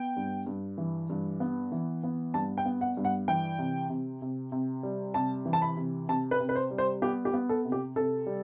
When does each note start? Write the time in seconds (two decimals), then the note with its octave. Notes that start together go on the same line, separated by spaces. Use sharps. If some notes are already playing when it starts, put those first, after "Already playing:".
Already playing: B3 G5
0.16 G2
0.46 G2
0.78 E3
1.10 G2
1.40 B3
1.72 E3
2.03 B3
2.34 G2 A5
2.58 G5
2.65 B3
2.81 F#5
2.97 G2
3.05 F#5
3.28 E3 G5
3.59 C3
3.90 C3
4.22 C3
4.52 C3
4.83 G3
5.14 C3 A5
5.46 E3
5.53 A5
5.62 B5
5.77 C3
6.09 C3 A5
6.31 B4
6.40 C3
6.49 B4
6.56 C5
6.71 G3
6.78 C5
7.02 B3 G4
7.25 G4
7.34 B3
7.49 A4
7.65 C3
7.72 G4
7.96 C3 A4
8.26 G3